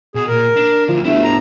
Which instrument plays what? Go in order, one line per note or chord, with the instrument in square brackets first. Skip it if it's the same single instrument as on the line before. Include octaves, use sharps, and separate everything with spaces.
[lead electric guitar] B2 [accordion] G#4
[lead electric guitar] A#2 A#3 [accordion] A#4
[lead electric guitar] D4
[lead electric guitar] D2 [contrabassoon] F3
[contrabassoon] G1 [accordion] A3 [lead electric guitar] E4 F#4
[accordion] A2 A#5